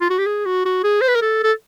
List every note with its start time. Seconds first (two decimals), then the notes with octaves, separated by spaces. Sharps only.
0.01 F4
0.10 F#4
0.19 G4
0.26 G#4
0.46 F#4
0.65 F#4
0.84 G#4
1.01 C5
1.08 B4
1.15 A#4
1.22 A4
1.43 A4